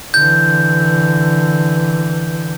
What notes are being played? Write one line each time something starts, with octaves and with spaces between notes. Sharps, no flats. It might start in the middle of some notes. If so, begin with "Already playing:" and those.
D3 E3 G6